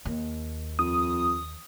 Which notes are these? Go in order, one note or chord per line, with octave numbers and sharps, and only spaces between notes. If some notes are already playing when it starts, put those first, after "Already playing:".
D#2
F2 D#6